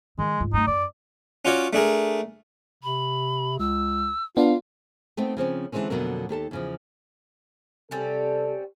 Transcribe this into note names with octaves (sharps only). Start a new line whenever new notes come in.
D#3 G#3
G#2 F4
G2 A3 D#4
F#2 D5
C#4 F4 F#4 C#5 D5
A3 D4 G#4 A#4
C3 B5
C#2 E6
B3 D4 F4 F5
A3 B3 C4 D#4 G5
C#3 F3 C4 C#4
D3 E3 F3 G#3 C4 C#4
F2 B2 D3 F#3 A#3
D#2 G4 A4 A5
E2 C#3 F3
C3 G3 C4 C#4 A4